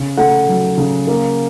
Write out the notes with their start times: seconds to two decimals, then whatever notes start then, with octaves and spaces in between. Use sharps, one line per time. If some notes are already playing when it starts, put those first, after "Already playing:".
Already playing: C#3
0.17 A3 F#5
0.48 F#3
0.78 C#3
1.07 A#3